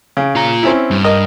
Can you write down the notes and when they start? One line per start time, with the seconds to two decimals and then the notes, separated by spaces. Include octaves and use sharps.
0.17 C#3
0.35 F4 A#5
0.63 C4 C#4 E4
0.91 G2
1.04 A#4 D#5